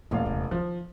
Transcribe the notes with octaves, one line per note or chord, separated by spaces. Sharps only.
E1 A1 F2 A#2 F5
D#1 C3
D3 D#3 F3